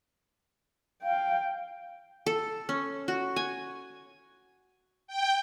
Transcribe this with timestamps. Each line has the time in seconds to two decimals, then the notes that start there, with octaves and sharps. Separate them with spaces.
1.03 F5 G5
2.26 A4
2.69 C#4
3.08 F#4
3.36 G#5
5.07 G5